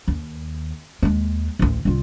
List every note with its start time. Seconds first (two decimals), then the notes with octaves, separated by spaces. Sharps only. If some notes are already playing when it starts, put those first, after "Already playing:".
0.08 D#2
1.03 D#2 G#3
1.59 A1 D2
1.85 C2 F4